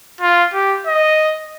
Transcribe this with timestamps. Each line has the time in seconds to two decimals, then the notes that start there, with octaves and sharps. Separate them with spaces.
0.21 F4
0.54 G4
0.86 D#5